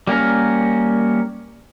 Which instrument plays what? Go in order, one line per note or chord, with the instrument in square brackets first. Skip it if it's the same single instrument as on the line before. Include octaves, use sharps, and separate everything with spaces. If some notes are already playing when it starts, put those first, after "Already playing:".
[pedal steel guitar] G3 A#3 C#4 A#4